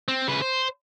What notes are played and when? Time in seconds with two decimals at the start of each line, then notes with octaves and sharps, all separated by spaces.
0.08 C4
0.27 C#3 B4
0.42 C5